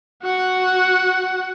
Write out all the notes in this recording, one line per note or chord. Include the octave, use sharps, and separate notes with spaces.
F#4 F#5